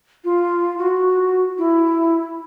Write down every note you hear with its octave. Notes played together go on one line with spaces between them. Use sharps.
F4
F#4
E4